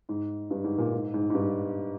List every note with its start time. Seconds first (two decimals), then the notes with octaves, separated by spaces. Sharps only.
0.09 G#2
0.51 G2
0.64 G#2
0.78 A#2
0.93 G#2
1.14 G#2
1.30 G#2
1.34 G2